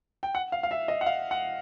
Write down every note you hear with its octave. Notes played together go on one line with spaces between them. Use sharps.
G5
F#5
F5
F5
E5
D#5
F#5
F5
F#5